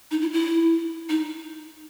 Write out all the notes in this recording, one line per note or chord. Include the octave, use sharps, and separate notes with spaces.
D#4
E4
E4
D#4